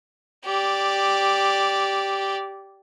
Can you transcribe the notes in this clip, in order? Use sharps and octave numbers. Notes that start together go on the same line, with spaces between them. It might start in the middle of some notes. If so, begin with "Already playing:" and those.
G4 D5